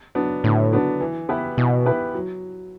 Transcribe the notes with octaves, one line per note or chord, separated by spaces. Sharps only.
F#3 B3 D4
A2 D3
F#3 B3 D4
E3
B3 E4 G4 B4
B2 E3
B3 E4 G4 B4
F#3